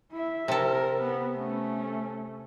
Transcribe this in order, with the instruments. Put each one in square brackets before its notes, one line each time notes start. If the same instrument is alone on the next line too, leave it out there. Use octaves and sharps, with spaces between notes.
[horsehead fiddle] E4 E5
[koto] C3 A4 [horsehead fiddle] A#4
[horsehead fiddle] B3
A3 C#4